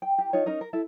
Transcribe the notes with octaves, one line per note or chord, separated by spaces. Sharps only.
G5
G4
D#4 F4 C#5
C#4 D#4 A#4 D#5
A#4
E4 A4 E5